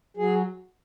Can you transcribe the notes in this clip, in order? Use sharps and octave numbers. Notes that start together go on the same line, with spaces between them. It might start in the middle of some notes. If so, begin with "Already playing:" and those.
F#3 G#4